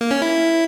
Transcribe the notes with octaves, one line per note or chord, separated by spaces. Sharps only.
A#3
C#4
E4